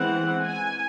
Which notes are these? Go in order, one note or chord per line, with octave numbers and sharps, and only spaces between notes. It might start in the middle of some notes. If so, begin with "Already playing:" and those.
Already playing: E3 G#3 C4 F#5
G#5